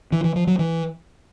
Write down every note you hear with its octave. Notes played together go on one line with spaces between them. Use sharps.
E3
E3
F3
F#3
E3